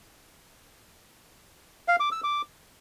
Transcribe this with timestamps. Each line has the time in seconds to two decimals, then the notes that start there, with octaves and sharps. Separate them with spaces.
1.88 F5
2.00 D6
2.12 E6
2.24 D6